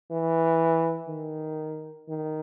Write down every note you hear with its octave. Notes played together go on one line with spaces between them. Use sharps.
E3
D#3
D#3